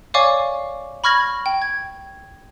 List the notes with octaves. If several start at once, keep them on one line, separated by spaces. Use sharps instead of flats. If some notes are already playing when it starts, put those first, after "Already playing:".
C#5 D5 F5 G#5 C#6 D6
B5 C#6 F6 G#6 A#6 F#7
G5
G#6